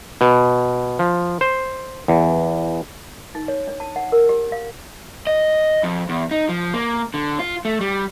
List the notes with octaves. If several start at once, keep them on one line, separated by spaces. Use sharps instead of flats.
B2
F3
C5
E2
D#4
C#5
D4
A5
F#5
A#4
G4
F5
D#5
F2
E2
D#4
F3
A#3
D3
F4
A3
G3